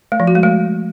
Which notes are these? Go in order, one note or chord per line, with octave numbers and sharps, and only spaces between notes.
A3
F3
F#4
G#3
A3